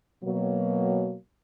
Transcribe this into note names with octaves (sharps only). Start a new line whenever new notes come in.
B2 F#3 A#3